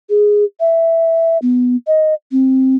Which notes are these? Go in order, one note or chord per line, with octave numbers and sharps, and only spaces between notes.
G#4
E5
B3
D#5
C4